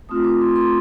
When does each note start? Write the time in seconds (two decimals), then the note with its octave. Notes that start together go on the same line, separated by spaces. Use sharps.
0.09 A3 C4 F4 D#6
0.24 D6
0.41 C6
0.56 C6